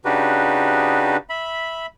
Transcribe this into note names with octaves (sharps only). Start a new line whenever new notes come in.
C#3 D4 D#4 F#4 G4 B4
E5 B5